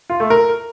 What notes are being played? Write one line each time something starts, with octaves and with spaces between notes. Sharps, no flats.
F4
A3
A#4